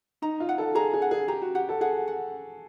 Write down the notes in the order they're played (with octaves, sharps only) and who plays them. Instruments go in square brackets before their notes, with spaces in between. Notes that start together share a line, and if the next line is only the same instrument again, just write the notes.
[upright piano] D#4 [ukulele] A#5
[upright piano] F4
[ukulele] F#5
[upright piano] A4
[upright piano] G#4 [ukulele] A#5
[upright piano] G#4
[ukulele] F#5
[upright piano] G#4
[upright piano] G4 [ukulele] A#5
[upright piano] F#4
[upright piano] G4 [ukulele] F#5
[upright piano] A4
[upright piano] G#4 [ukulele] F#5
[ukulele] F#5